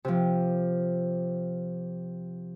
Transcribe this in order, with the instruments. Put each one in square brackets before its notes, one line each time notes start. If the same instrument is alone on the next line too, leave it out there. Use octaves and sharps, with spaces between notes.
[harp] C3 F3